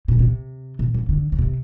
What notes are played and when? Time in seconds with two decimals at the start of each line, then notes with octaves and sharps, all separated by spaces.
0.08 A#2
0.19 C3
0.79 A#2
0.94 D3
1.09 D3
1.32 D3
1.39 C3